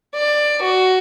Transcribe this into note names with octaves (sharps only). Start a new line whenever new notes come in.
D5
F#4